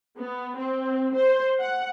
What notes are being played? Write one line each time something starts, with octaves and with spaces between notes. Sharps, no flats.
B3
C4
C5
F#5